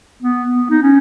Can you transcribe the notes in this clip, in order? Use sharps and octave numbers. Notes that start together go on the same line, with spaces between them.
B3
B3
D#4
C#4